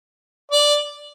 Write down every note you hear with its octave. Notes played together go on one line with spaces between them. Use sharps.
D5